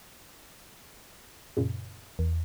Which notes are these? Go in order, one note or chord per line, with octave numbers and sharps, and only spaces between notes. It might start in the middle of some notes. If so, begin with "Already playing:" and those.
F#2 A#2 C#3
E2